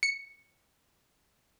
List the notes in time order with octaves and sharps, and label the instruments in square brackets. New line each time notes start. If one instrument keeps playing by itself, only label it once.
[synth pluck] C#7